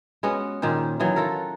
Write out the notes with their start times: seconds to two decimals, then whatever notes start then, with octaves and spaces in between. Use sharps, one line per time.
0.23 G#3 B3 C#4 F#4
0.62 A#2 D#3 C#4 C5
1.00 D#3 E3 F#3
1.16 F4 F#4 A4 A#4